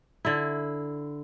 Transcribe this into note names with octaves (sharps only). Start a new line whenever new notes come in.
D3 E4